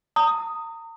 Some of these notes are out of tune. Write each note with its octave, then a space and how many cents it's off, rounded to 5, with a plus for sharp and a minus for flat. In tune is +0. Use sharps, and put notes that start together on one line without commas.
A#5 -35 D#6 +0